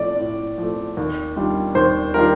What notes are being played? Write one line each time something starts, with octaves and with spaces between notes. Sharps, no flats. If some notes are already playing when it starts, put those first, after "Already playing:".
Already playing: A2 F3 A3 D5
A2
F3 A3
D#2
D#3 G3 D4 F4
D#2 C5
D#3 G3 D4 F4 A#4